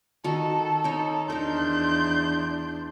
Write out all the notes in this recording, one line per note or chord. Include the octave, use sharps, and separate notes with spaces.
D#3 F#4 A4
D#4 C#5
E2 D4 D#4 A#4 C6 G6